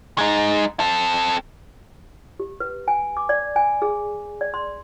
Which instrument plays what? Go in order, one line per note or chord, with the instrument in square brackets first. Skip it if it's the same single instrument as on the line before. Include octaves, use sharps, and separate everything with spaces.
[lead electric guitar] G#3 D#4
C4 A4
[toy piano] G4
B4
G#5
D6
D5
G#5
G#4
D5
C6